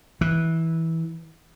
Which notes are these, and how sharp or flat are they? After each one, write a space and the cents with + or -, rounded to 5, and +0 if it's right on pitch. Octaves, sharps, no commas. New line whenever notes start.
E3 -15